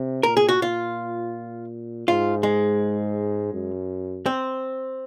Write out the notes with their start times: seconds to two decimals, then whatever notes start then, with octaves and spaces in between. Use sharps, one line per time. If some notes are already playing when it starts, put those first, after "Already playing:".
Already playing: C3
0.23 A#2 A#4
0.37 G#4
0.49 F#4
0.62 A#2 F4
2.08 G#2 F4
2.43 G#3
3.53 F#2
4.26 C4